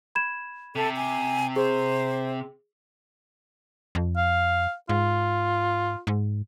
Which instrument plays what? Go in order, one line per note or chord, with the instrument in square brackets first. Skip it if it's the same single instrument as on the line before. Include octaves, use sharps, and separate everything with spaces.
[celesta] B5 G#6 E7
[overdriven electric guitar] C3 [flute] A4
[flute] G#5
[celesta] G#4 [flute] C5
[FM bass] F2
[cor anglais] F5
[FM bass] G#2 [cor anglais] F4
[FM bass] G#2